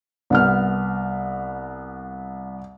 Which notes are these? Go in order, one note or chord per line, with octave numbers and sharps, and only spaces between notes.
C2 B3 F6